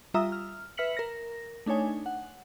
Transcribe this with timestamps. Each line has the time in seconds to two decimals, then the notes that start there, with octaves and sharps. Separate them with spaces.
0.14 G3 F4 E5 A#5 D#6 E6
0.32 F6
0.77 B4 E5 F6 B6 C#7 F#7
0.97 A#4 A#6
1.66 A3 D4 D#4 C#5 G#5
2.06 F#5